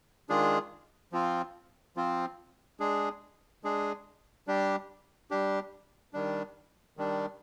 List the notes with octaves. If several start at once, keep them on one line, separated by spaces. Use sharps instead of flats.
D#3 G#3 D4 F4 G#4
F3 C4 F4
F3 C4 F4
G#3 D4 G#4
G#3 D4 G#4
G3 D4 G4
G3 D4 G4
D#3 G3 D4
D#3 G3 D4